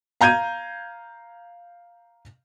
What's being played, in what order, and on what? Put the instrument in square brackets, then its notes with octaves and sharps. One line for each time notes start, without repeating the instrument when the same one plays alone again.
[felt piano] F5 A#5 G6 G#6 D#7